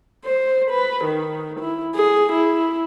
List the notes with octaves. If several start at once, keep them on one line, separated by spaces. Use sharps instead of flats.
C5
B4
D#3
E4
G#4
E4